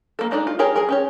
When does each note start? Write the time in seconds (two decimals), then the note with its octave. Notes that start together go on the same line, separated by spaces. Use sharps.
0.19 A#3 A4
0.31 G#3 D4 D#4 D5
0.47 F4
0.59 G4 G#4 A#4 C#5
0.76 G#4 A#4
0.89 C#4 G4 C#5